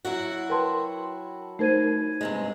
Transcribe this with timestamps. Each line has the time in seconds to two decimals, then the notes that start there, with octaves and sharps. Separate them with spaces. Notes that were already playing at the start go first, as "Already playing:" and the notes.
0.05 F#3 E4 F#4
0.49 A#4 B4 G5 A5 C6
1.59 A3 D#4 A#4 C5 G#6 D#7
2.21 G2 C3 G#3